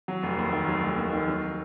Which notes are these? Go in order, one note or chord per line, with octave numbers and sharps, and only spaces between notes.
F#3
F1
D#2
D#3
F#3
F1
D#2
D#3
F#3